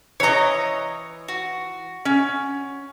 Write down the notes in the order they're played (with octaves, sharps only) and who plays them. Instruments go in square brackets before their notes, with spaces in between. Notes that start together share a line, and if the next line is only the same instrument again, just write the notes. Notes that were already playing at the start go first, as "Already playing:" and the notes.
[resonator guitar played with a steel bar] E3 A#5 [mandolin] C#5 D#5
[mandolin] F#4
[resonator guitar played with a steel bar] C#4